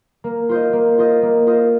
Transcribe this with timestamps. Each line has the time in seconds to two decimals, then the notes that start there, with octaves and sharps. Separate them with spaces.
0.24 A#3
0.49 F4 C5 D#5
0.73 A#3
0.98 F4 C5 D#5
1.23 A#3
1.47 F4 C5 D#5